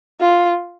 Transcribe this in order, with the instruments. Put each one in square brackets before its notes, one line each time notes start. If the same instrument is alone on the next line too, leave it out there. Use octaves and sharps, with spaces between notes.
[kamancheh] F4